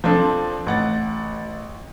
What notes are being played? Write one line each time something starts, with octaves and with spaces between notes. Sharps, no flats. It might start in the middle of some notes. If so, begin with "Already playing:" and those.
F3 C4 D4 A4
A1 F#5 A6